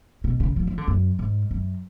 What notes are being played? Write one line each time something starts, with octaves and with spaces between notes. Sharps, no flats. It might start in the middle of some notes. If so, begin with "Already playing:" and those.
B2
C#3
F3
F3
D3
F#2
G#2
F#2